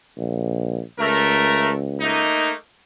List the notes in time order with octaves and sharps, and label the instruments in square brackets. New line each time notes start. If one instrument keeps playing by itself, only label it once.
[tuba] A#1
[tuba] C#2 [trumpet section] A3 A#4
[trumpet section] A3 A#3 D#4